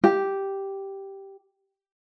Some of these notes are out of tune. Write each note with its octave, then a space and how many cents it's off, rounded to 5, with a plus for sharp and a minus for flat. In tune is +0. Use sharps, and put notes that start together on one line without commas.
G4 -5